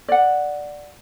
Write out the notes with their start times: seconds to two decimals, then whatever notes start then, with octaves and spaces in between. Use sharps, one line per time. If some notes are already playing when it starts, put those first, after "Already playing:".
0.08 D5 F#5